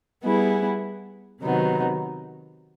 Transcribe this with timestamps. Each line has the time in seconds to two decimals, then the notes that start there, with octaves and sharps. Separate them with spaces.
0.24 G3 B3 E4 G#4
1.42 C3 D#3 F#3 B3 D#4